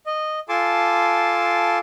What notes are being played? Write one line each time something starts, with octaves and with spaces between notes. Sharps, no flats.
D#5
F4 A4 G#5 A5 C6 D6